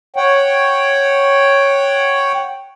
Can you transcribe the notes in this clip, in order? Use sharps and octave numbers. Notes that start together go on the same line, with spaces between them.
C#5 F#5 G5